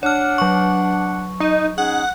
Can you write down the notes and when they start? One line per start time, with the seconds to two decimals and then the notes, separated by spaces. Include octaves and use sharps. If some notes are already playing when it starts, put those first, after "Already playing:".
0.03 D4 C#5 F#5 F6
0.38 F#3 C#6
1.40 D#4
1.78 C#4 D#4 G#4 F#5